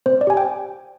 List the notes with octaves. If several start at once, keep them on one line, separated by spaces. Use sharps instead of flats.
C4 C5
D5
G4 G#5
G5